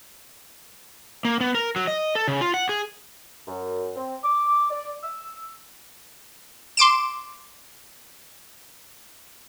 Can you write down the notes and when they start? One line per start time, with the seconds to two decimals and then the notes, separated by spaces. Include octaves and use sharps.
1.25 A#3
1.41 B3
1.55 A#4
1.76 F#3
1.87 D#5
2.15 A4
2.28 C#3
2.41 F4
2.54 F#5
2.69 G#4
3.48 F#2
3.96 C4
4.24 D6
4.71 D5
5.03 E6
6.77 C6 D6 D7 E7